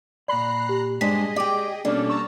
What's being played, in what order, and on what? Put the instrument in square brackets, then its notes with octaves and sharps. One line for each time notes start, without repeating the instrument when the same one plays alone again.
[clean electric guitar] A#2 B5 [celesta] D5 [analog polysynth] A#5 F#6 C7
[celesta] G4
[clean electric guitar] G2 [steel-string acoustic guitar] G#3 D4 C5 [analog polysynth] G#4 D#5 [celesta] B6
[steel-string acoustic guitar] G4 G5 [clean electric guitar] D5
[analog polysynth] B2 C#4 A4 [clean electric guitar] G3 A#3 [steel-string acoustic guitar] D4
[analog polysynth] A5 A#5 E6 [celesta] C#6